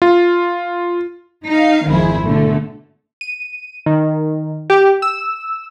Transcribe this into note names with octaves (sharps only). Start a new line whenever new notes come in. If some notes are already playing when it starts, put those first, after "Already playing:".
F4
D#4 F5
G#1 F2 D#3 E4 G#4 C5
B2 D3 A3
D#7
D#3
G4
E6